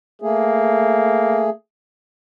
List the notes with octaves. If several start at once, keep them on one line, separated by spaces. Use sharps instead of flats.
A3 A#3 G#4